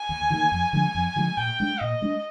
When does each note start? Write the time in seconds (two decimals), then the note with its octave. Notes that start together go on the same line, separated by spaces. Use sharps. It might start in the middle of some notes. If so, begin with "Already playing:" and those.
Already playing: G#5
0.09 D#2
0.30 D#3 G3 A#3
0.52 F2
0.73 D3 F3 G#3
0.95 F2
1.16 D3 F3 G#3
1.37 A#2 G5
1.60 G#3 D4
1.80 A#2 D#5
2.02 G#3 D4